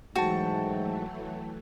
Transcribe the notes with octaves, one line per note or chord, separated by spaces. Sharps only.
G#2 E3 F#3 A3 F#4 G5 A5